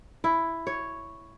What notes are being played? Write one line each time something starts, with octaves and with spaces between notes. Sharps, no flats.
E4
C#5